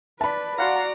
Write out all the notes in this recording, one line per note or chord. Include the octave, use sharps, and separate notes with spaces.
B4 D5 A5 B5
F#4 D5 F5 F#5 A#5 C6